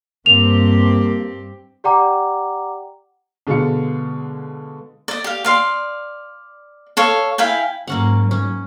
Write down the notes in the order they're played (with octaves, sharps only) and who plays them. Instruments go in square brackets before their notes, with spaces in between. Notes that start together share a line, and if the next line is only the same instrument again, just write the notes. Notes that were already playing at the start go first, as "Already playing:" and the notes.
[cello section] G2 C4 G4 [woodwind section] A#3 [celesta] F7
[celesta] G4 D5 F#5 G5 A#5 D6
[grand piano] B2 D3 G#3 D4 F5 C#7
[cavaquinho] D5 D#5
G4 F5
D5 F5 C6
A4 C#5 F5
E4 F5 G5 G#5
[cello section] G#2 F#3 [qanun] A#3 C#4 F#5
[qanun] C#4